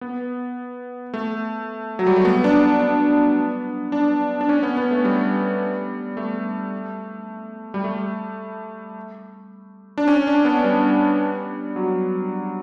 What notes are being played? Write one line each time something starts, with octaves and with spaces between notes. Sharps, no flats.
B3
A3
F#3
G3
A3
B3
D4
B3
D4
D4
C#4
B3
B3
A3
G3
A3
G3
A3
D4
C#4
D4
B3
G3
F#3